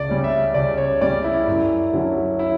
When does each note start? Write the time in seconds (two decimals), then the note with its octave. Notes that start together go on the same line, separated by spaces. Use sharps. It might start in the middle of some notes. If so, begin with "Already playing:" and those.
Already playing: C#2 D5
0.09 C#3 G3 C#4
0.24 E5
0.54 C#2 D5
0.78 C#5
1.01 C#3 G3 C#4 D5
1.24 E4
1.47 F#2
1.93 D3 F#3 C#4
2.39 E4